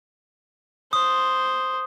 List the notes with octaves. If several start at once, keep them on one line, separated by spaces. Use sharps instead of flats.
C5 D#6